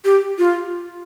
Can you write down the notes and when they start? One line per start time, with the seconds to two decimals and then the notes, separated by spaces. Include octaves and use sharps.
0.05 G4
0.38 F4